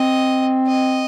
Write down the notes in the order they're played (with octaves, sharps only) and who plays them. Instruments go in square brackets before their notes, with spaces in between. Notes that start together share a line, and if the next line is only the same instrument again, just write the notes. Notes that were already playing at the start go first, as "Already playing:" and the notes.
Already playing: [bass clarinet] C4 [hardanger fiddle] D#5
[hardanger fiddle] D#5